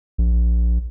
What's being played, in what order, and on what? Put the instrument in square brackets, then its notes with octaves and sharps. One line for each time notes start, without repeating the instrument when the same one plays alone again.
[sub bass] A#1